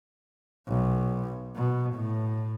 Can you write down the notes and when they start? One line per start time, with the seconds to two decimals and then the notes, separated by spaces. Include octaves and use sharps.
0.68 B1
1.56 B2
1.95 A2